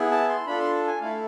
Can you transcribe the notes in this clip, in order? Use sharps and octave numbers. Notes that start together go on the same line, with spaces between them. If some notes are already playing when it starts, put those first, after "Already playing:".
Already playing: B3 E4 G#4
A5
C6
D4 F4 A4 B5
C6
G#5
A3 E4 A4 F5